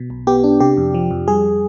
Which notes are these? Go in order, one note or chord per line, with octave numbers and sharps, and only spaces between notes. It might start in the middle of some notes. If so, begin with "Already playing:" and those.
Already playing: B2
B1
B3 G4
D4
C3 G4
F2
F3
F2
G3 G#4